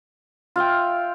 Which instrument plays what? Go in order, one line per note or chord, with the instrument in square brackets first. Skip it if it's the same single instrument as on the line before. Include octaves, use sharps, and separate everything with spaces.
[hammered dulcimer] F4 E5 F5 G5